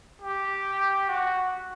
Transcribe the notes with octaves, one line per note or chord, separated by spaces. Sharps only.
G4
F#4